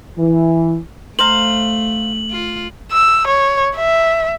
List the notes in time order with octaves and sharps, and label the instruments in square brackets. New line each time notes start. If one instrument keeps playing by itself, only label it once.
[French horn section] E3
[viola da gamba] A3 [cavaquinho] C5 F5 A#5 [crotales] F#7
[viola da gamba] F4
[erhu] E6
C#5
E5